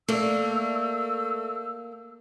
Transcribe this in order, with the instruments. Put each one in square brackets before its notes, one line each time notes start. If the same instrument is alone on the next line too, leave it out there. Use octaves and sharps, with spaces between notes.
[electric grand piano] A3 [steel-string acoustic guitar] A#3 [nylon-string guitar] A#4 D5 [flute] E6